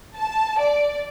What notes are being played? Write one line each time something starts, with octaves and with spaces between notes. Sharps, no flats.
A5
D5